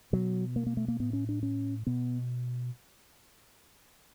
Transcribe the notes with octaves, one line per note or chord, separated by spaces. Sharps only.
B2 F#3
A#3
A#3
A3
A#3
A2 B3
C#4
D4
C#4
B2 B3